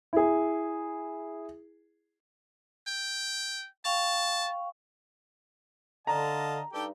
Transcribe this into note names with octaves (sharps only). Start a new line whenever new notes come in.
E4 G#4
G5
F5 G5 A5 C#6
D3 D#5 F5 A5 A#5
G2 D#4 G4 A4 G5